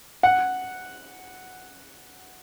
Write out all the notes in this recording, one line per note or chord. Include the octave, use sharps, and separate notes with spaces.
F#5